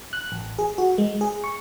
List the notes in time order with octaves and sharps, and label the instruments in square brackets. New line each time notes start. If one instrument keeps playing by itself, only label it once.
[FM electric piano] F#6
A1
G#4
F#4
G#3
G#4
C#6